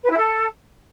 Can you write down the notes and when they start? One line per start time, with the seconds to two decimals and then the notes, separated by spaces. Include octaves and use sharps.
0.04 B4
0.10 E4
0.17 A4